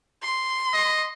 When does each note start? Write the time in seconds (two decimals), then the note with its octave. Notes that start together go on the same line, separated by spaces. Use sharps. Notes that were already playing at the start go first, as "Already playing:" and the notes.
0.23 C6
0.73 D#5